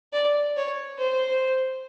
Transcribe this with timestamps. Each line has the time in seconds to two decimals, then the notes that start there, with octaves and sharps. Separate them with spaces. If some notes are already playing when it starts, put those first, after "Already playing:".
0.13 D5
0.56 C#5
0.98 C5